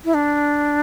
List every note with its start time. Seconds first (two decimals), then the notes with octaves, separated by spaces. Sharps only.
0.05 E4
0.14 D4